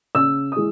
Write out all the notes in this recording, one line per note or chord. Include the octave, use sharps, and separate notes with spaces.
C#3 E6
D#6
E3 G#3